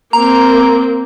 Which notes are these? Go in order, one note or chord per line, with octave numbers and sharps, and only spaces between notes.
A#3 C4 A#5